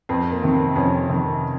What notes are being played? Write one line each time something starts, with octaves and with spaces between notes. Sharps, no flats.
F2 C4
A#3
C3 D#3
C4
F2 C#4
C3 D#3